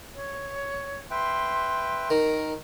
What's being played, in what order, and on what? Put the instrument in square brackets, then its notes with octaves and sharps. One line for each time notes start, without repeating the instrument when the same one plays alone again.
[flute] C#5
[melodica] B4 E5 G5 [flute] C6
[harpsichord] D#3 [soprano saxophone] A#4